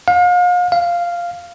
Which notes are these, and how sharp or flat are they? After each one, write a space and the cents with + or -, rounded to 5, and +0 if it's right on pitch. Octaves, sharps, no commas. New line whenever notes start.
F5 +40
F5 -5